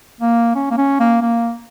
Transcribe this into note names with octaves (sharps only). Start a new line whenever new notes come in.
A#3
C#4
A#3
C#4
A#3
A#3